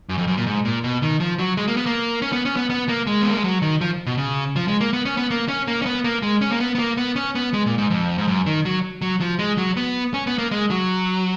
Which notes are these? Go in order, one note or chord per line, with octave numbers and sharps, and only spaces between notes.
F#2
F2
F#2
A#2
G#2
A#2
B2
D#3
F3
F#3
G#3
A#3
B3
A#3
C#4
B3
C#4
B3
B3
A#3
G#3
B3
A#3
G#3
F#3
D#3
F3
B2
C#3
F3
G#3
A#3
B3
C#4
B3
A#3
C#4
A#3
C#4
B3
A#3
G#3
C#4
A#3
B3
B3
A#3
B3
C#4
B3
G#3
A#2
G#2
F2
G#2
F#2
D#3
F#3
F#3
F3
G#3
F#3
B3
C#4
B3
A#3
G#3
F#3